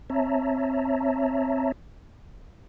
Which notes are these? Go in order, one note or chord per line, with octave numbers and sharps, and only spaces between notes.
C4 C#5 E5 A5 A#5